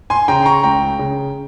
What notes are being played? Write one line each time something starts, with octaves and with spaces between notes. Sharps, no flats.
G#5 C6
C#3 G5 A#5
C6
A#5 C#6
C#2 G5 A#5
C#3